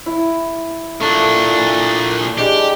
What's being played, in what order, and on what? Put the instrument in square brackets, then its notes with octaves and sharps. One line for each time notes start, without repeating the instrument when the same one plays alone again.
[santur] E4
[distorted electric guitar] A#2 D4 [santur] A3
[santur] G3 G#3 D4 [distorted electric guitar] G4